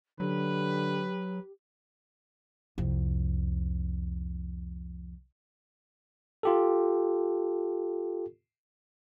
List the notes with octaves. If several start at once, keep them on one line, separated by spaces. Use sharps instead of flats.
D3 F#3 G4 B4
C2 F2
F4 G4 A4